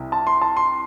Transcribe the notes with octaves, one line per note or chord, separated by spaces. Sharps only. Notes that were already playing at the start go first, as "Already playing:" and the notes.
Already playing: C2 C3 E4
A5
C6
A5
C6